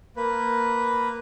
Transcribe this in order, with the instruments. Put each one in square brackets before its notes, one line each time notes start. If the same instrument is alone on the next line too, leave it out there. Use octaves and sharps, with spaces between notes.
[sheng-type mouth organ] A#3 B4